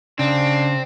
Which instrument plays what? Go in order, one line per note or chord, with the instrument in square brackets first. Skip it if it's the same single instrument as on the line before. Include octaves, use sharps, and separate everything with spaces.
[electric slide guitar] C#3 [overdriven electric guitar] C4 [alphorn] D4